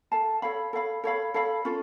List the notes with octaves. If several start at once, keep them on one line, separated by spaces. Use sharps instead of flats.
A4 F5 A5
A4 C#5 F5 B5
A4 C#5 F5 B5
A4 C#5 F5 B5
A4 C#5 F5 B5
C#4 F4 A4